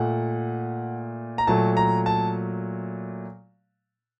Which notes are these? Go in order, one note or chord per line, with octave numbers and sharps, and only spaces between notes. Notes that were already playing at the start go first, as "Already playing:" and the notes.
Already playing: A#2 A3 F#5
A#5
A#2 F#3 A3 A5
A#5
A5